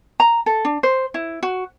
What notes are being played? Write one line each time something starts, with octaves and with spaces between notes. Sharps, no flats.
A#5
A4
D4
C5
E4
F#4